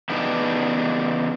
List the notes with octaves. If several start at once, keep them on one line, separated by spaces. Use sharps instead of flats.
C#3 E3 B3 D4 D#4 G4